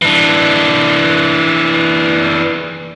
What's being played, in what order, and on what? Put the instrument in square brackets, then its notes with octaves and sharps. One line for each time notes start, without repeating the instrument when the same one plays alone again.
[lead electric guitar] E3 D4